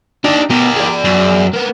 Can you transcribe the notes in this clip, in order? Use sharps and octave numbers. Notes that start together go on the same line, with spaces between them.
D4 D#4 G4
B2 G4 A#4
G#4 D5
F#2
A#3 B3